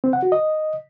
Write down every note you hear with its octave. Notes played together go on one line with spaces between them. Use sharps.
C4
F#5
F#4
D#5